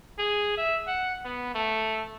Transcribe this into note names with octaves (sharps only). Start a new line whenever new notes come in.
G#4
E5
F#5
B3
A3